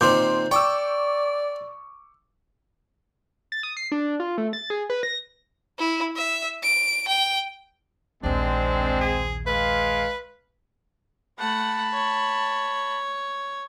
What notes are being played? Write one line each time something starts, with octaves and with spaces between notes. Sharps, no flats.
A#2 D#3 C4 C6 D6 G6
D5 G5 C#6 D6 E6
A6
D#6
C7
D4
F4
A3
A6
G#4
B4
A#6
E4
E5
D7
G5
A#1 D#2 G#3 C4 D4
G#4
G#3 B4 F5
A3 F#5 A5 B5
C#5